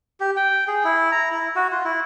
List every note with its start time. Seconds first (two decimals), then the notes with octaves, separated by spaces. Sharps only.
0.20 G4
0.36 G5
0.68 G#4
0.85 E4
1.12 A#5
1.31 E4
1.56 F#4
1.72 F4
1.84 E4